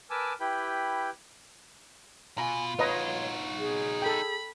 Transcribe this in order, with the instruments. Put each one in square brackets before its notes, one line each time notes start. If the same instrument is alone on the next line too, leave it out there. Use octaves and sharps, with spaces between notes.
[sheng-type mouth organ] A#4 B4 G#5 A5 D6 E6
E4 G4 B4 G5 B5
[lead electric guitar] B2 [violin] F4 [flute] G#5 [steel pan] A#5
[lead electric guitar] D#4 F#4 [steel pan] B4 D#5 A#5 [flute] C#5
[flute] G#4
[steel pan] A4 G5 [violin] B5